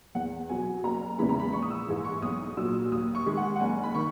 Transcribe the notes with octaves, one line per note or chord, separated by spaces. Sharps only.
E2 F#5
B2 F#3 G#5
F#1 A#5
E2 C#3 E3 G#3 B5
A#5
B5
A#1 C#6
D#6
E6
G#2 E3 G#3
C#6
B1 D#6
A#2 F#3 E6
D#2 D#6
C#6
D#3 G#3
F#5
F#5
F#1 G#5
B5
D#3 C#6